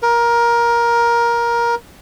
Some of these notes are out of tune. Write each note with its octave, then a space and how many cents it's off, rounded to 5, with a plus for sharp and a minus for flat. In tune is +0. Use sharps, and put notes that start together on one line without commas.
A#4 +15